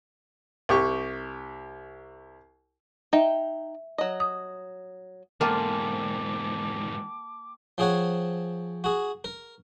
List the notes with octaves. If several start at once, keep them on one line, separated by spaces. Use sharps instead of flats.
C2 G4 C#6
D#4 E5 G5
F#3 D#5
D#6
E2 G#2 A#3 F4 G5 A5 D6
F3 C4 G#4 C#5 F#5 G#5
F#4 G#4
A#4